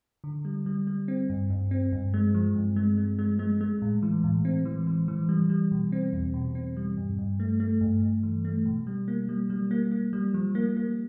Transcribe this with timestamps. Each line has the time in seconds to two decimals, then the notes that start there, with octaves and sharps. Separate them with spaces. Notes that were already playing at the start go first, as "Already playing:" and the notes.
0.24 D3
0.45 G3
0.66 G3
0.87 G3
1.08 C4
1.29 G2
1.50 G2
1.71 C4
1.92 G2
2.14 G#3
2.34 F3
2.55 G2
2.76 G#3
2.97 G#3
3.19 G#3
3.39 G#3
3.61 G#3
3.82 A2
4.03 E3
4.24 A2
4.45 C4
4.65 E3
4.87 E3
5.08 E3
5.29 G3
5.50 G3
5.72 B2
5.92 C4
6.13 E2
6.34 B2
6.55 C4
6.77 G3
6.97 G2
7.18 G2
7.40 A3
7.60 A3
7.81 G2
8.02 G2
8.23 E3
8.45 A3
8.65 B2
8.87 G3
9.08 A#3
9.29 G3
9.50 G3
9.71 A#3
9.91 A#3
10.13 G3
10.34 F3
10.55 A#3
10.76 A#3